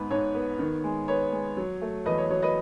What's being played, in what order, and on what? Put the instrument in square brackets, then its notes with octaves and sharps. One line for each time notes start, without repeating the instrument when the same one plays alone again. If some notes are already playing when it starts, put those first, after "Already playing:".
Already playing: [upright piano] G#2 B3 B4
G#2 C#5
B3
D#3
G#3
B3 C#5
G#3
F#3
A3
E2 B4 D#5
C#5
F#3 C#5
B4 D#5